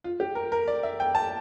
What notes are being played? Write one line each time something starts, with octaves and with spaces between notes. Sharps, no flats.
F4
G4
A#4
A#4
D5
E5
G5
A5